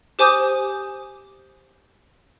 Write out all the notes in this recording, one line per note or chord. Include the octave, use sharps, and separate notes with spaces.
G4 C5 G#5 D6 D#6 G6